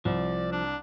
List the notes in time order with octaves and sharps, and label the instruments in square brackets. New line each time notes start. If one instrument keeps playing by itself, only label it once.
[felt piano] C2 [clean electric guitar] F3 [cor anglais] D5
[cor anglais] D4